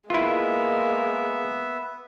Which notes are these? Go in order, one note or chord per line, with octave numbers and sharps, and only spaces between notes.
G#3 A#3 B3 E4 F4 E5